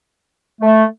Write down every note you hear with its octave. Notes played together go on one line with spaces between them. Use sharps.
A3